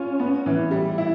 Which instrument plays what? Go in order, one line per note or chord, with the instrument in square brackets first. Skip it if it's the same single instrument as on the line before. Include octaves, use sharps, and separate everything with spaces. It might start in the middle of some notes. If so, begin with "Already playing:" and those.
Already playing: [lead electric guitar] C#4 [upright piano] F4
[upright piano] B3
E3
G3
E4